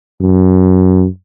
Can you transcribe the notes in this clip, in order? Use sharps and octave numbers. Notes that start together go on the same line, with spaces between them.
F#2